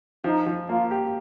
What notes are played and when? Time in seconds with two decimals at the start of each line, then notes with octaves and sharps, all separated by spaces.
0.24 F3 D#4
0.47 F3
0.69 A#3 F4
0.91 G4